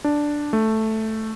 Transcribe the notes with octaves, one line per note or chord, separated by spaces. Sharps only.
D4
A3